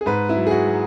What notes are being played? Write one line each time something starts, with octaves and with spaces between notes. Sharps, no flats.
G#4
G#2 B4
E4
F#3
G#4
F#4
F#3